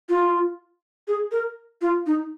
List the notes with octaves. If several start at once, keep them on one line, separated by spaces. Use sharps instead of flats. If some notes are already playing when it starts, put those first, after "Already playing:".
F4
G#4
A#4
F4
D#4